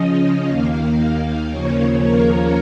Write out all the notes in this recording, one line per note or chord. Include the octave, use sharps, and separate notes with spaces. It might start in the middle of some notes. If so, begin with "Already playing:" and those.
Already playing: C#3 F3 C#4 D#5
D#2 D#3 A#3 F5
D#2 C#3 F3 A#3 C#5
A#4